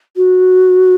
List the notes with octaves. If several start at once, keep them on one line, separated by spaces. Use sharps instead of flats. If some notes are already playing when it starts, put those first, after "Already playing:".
F#4